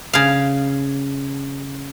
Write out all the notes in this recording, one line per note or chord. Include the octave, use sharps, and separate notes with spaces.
C#3 F5